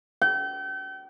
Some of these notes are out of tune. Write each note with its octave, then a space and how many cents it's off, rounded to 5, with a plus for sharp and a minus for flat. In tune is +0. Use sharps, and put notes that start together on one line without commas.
G5 -40